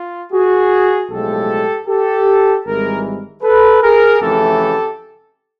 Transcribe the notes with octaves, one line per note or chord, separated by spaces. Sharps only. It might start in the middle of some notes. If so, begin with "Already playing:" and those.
Already playing: F4
F#4 G#4
B1 A2 F3 G#3 G4 A4
G4 A4
G#1 G#2 E3 G3 G#4 A#4
A4 B4
G#4 A#4
F2 C#3 E3 A3 G4 A4